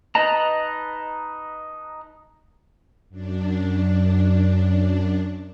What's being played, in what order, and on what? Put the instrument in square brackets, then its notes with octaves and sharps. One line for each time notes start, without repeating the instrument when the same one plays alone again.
[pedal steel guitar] D#4 B4 D#5 A5 A#5
[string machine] F#2 D4